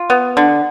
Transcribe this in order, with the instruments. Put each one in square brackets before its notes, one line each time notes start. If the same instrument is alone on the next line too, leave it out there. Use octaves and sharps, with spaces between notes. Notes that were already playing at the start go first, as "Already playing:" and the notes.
Already playing: [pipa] F4
B3
D3